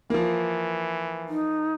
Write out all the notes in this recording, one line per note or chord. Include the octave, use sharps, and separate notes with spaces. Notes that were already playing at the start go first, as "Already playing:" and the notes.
E3 F3 A#3
D#4